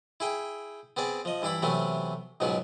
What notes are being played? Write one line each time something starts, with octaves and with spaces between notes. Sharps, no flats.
E4 G#4 G5
B3 C4 G#4 D5
F3 D#5
G2 E3 D4 E4 B5
C3 E3 F#3 A3 B3
C#2 G#2 B2 F#3 B3